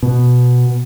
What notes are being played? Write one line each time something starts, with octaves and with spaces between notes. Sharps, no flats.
B2